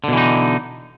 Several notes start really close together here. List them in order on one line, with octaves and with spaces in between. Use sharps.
D3 B2 E3 D#4